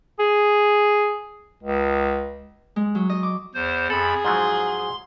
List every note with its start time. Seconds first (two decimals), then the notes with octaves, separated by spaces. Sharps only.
0.19 G#4
1.63 C#2
2.76 G#3
2.95 F#3
3.10 D#5
3.23 D6
3.54 E2 C5
3.90 F2 G#4 A4 B5
4.25 G#2 F3 F#3 C6